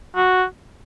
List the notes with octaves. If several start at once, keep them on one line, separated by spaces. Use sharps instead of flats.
F#4